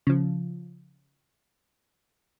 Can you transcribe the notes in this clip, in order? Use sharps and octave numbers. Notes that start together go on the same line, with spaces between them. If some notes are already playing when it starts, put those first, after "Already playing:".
C#3 F3